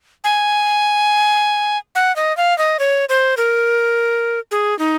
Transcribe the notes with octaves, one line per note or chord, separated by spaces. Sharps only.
G#5
F#5
D#5
F5
D#5
C#5
C5
A#4
G#4
D#4